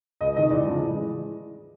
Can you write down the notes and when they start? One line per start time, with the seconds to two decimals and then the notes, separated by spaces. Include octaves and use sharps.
0.21 C#2 D#5
0.36 C3 D#3 G#3 D#5
0.50 E2 D5
0.66 C#3 F3 G#3
0.81 A2
0.96 E3 G#3